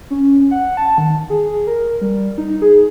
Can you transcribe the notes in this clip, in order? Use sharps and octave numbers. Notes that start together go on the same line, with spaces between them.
C#4
F#5
A5
D#3
G#4
A#4
G3
D#4
G#4